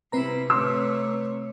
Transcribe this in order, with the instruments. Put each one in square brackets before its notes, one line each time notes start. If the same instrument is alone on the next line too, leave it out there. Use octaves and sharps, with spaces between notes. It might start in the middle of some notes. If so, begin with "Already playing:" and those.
[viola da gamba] C3 G3 E4 [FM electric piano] C4 B4 A#5
[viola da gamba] A3 C#5 [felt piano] C6 D6 E6